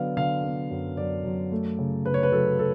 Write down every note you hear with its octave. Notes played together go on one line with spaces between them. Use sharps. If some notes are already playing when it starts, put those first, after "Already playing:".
Already playing: D3 F#3 B3 D5 F5
D3 F5
B3
F#2
F#2 D5
F#2
A3
C#3
C#3 B4
C#5
B4
F#3 A4
A4